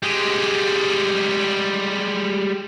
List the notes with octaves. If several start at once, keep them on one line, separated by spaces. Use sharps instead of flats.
G3 G#3